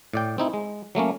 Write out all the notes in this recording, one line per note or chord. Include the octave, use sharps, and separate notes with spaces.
A2 D5 G5
C4 D#4 E4
G#3
F#3 A3 A#3 C#4